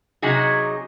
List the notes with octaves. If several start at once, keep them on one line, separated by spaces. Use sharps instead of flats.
C3 F#3 D#4 F#4 G#4